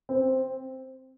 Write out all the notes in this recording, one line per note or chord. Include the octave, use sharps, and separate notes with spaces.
C4